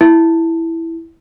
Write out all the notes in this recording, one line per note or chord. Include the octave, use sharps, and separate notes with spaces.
E4